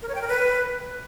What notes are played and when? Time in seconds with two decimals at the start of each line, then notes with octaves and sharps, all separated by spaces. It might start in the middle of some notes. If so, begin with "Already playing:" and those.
0.02 A#4
0.08 C#5
0.15 G5
0.21 A#4
0.28 B4